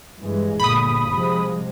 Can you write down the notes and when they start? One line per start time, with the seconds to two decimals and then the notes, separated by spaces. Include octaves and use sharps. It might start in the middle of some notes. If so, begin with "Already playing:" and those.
0.21 G2 E3 G#3
0.60 G1 A#2 B5 D#6
1.11 C3 F3 G#3